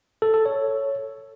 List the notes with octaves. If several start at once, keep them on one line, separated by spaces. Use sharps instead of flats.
A4
A4
C#5